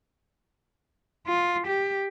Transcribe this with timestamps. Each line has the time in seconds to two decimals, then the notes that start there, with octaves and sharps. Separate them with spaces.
1.27 F4
1.67 G4